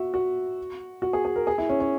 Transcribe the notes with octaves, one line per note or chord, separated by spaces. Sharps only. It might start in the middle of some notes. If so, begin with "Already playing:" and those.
Already playing: F#4 E5
F#4
F#4
G#4
G#4
A#4
G#4
E4
C#4
C#4